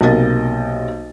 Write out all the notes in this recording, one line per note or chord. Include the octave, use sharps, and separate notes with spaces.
B1 C3 A#3 D#5 A6